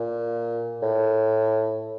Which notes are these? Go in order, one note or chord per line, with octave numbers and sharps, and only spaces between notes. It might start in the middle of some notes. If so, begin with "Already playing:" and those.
Already playing: A#2
A2